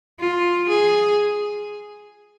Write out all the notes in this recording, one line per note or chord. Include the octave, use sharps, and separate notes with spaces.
F4
G#4